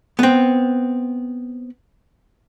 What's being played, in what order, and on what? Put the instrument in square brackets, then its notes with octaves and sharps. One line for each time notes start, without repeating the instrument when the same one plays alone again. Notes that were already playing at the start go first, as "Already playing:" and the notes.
[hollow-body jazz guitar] B3 C4